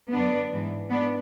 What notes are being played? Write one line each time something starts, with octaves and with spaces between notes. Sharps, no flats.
F#2 D3 B3 D4
G#2 E3
G#2 B3 D4